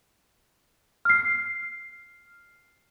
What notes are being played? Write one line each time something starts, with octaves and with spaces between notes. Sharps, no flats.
F6 C7